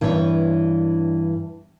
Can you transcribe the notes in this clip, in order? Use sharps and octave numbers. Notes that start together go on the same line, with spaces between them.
G2 E3 B3 D4 F4 C#5